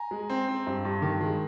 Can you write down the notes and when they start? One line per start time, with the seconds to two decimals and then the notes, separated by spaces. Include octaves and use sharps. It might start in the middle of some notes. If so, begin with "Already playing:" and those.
Already playing: G#5 A#5
0.11 G#3
0.30 C4
0.48 C4
0.67 G2
0.85 G2
1.02 D#3
1.21 G#3